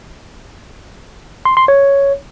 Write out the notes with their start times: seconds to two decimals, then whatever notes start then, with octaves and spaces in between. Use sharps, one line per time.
1.45 C6
1.57 C6
1.68 C#5